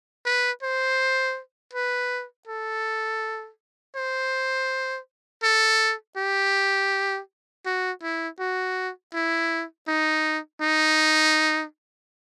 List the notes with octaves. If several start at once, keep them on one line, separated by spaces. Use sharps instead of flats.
B4
C5
B4
A4
C5
A4
G4
F#4
E4
F#4
E4
D#4
D#4